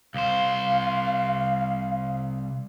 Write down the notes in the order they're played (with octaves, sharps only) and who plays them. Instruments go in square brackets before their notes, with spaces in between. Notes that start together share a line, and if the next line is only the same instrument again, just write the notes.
[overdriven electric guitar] C2 C5 [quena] F5